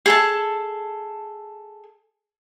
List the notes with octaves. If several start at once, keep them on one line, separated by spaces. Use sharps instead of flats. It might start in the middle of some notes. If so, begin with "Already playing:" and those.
G#4 A4 A5